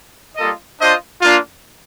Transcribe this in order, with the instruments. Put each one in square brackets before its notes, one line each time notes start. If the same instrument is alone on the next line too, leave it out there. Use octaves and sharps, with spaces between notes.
[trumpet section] G3 A#3 F4 A4 D#5
D4 F4 C5 D#5
A#3 D4 F4